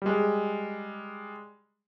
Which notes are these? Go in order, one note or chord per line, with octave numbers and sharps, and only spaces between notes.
G3 G#3